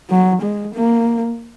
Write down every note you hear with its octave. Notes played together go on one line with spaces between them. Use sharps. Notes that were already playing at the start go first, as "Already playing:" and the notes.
F#3
G#3
A#3